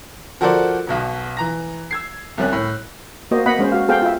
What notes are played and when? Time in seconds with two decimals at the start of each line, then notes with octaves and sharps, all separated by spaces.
0.41 F3 F#4 A4 A#4 C5 D5
0.87 B1 B2 B3
1.37 E3 A#5 A#6
1.91 E6 G#6 C7
2.38 C2 G3 C#4 F#6
2.53 A2
3.31 A#3 F#4 C5 D#5
3.46 B3 D#5 F#5 B5
3.59 G#3 C#4 C5
3.72 F#4 F5
3.88 B3 G#4 A4 C5 F5 G5
4.02 F4 E5